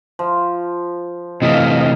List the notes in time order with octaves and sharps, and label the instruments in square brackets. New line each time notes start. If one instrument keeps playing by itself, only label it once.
[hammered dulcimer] F3
[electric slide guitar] C3 E3 A3 [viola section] D#5 F5